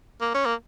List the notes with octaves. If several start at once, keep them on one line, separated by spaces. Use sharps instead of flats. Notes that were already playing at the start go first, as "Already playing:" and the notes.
A#3
C#4
A#3